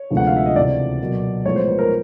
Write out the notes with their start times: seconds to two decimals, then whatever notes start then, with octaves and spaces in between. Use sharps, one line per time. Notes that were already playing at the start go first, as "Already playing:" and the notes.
Already playing: C#5
0.10 D2 C3 F3 G#3 B3
0.17 F#5
0.27 F5
0.37 E5
0.46 D#5
0.56 C#2 C3 E3 D5
1.01 B2 F#3 A#3
1.45 A2 F3 G#3 B3 C#5
1.56 C5
1.68 B4
1.79 A#4